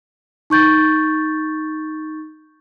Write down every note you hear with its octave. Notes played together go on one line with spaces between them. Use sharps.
D#4 C#6 G6 A6